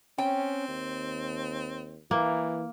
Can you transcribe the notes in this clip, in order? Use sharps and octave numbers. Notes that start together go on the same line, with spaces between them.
C4 C#4 G5
D#2
E3 A#3